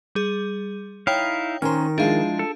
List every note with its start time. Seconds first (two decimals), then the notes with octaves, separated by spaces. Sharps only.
0.15 G3 G#4
1.07 D#4 E4 C#5 F5 G5
1.62 D#3 C#4 A#4 C5 A#5 F6
1.98 F3 G#3 D4 E4 G#4 F5
2.39 A4